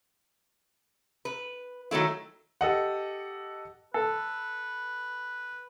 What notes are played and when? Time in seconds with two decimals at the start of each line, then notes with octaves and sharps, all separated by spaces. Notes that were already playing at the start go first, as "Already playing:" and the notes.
1.25 B4
1.91 D#3 F#3 A3 E4
2.61 G4 A4 D#5 F#5
3.94 A4 B4